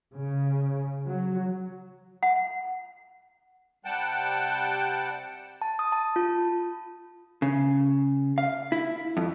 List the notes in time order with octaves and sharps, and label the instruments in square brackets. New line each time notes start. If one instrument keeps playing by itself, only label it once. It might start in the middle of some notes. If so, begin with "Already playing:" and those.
[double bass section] C#3
F#3
[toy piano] F#5
[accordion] C3 G3 F#5 G5 A5
[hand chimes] A5
D#6
A5
F4
[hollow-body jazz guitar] C#3
F5
E4
F2